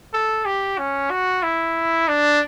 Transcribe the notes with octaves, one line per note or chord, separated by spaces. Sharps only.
A4
G4
C#4
F#4
E4
D4